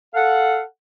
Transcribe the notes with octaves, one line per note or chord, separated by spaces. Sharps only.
A4 F5 F#5